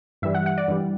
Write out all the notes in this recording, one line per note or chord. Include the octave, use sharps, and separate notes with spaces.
G2 E3 G3 E5
F#5
F#5
D5
G2 E3 G3